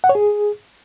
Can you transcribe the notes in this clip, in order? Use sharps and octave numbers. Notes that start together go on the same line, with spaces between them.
F#5
C#5
G#4